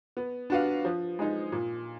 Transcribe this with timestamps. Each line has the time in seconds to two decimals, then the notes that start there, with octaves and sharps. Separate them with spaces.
0.17 B3
0.50 D4 F#4 B4 F5
0.85 F3
1.19 G#3 D#4
1.52 A#2